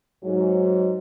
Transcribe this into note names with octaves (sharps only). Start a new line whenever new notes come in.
G#2 F#3